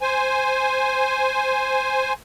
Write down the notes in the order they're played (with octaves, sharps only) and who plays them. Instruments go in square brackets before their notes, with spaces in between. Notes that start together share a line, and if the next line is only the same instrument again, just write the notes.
[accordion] C5 G#5